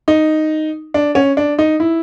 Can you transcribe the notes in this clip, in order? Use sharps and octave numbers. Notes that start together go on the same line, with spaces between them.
D#4
D4
C#4
D4
D#4
E4